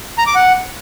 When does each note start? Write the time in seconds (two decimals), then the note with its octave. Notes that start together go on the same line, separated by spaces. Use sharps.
0.18 A#5
0.27 D6
0.35 F#5